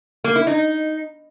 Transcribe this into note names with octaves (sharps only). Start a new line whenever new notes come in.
A#3
E4
D#4